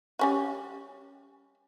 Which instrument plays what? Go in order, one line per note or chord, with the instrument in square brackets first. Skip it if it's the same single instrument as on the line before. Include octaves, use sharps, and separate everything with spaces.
[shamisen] G3 C#4 F#4